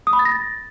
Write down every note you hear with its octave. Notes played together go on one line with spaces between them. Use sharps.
D#6
B5
A6
A#6
A6